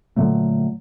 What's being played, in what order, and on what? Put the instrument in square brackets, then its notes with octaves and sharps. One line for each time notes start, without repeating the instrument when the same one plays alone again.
[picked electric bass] A#2 D3 F#3 A3